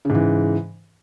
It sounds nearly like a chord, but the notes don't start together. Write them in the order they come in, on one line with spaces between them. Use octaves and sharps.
C#3 G#2 E3